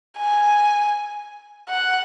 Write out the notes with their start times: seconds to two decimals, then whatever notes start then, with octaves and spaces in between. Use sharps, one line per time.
0.17 G#5
1.70 F#5